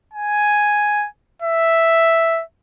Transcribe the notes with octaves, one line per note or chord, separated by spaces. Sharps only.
G#5
E5